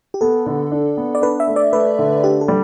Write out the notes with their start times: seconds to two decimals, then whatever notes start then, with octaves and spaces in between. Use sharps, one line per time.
0.14 G4
0.21 B3 A4
0.46 D3
0.72 D4
0.97 B3
1.15 D5
1.22 D4 B4
1.40 E5
1.47 A3
1.56 D5
1.72 A3 B4
1.99 D3
2.24 D4 G4
2.41 A4
2.48 G3